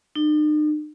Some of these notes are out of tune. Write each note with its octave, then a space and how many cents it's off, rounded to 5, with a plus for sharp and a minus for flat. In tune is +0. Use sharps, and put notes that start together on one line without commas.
D#4 -45